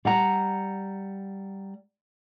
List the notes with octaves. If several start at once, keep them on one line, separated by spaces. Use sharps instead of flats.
G3 F#5 A#5